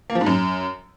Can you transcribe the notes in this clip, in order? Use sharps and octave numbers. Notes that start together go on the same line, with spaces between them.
A#3
F3
G#2
F#2